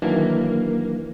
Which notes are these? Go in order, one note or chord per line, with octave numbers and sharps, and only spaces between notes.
D#3 E3 F#3 A#3 D4